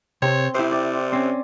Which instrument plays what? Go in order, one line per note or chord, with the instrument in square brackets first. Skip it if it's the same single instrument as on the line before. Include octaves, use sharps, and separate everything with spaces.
[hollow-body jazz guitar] C3 [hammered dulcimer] C4 C6 [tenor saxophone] C#5
[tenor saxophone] C3 [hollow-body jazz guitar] E4 C5
[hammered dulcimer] D5
[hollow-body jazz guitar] C4 C#4